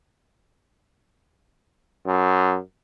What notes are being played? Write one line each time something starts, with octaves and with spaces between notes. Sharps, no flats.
F#2